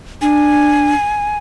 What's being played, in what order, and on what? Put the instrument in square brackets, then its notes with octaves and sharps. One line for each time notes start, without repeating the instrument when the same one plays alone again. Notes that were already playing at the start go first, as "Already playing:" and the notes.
[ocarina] D4 [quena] G#5